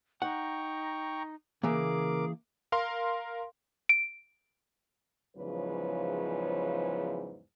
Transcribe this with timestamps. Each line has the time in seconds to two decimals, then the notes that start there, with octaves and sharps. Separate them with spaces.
0.22 D#4 F#5 G5 A#5 C#6
1.63 C#3 E3 A#3 G#4 A#4 D6
2.72 A#4 F5 C6
3.89 D7
5.37 E2 G#2 C#3 F3 F#3 B4